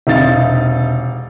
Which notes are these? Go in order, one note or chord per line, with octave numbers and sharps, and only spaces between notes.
E1 C3 D#4 F5 A6